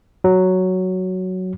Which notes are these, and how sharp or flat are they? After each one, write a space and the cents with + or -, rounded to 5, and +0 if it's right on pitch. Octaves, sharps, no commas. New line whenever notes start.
F#3 +5